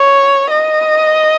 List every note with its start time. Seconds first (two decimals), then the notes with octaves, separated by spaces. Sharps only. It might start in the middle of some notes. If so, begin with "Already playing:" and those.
Already playing: C#5
0.51 D#5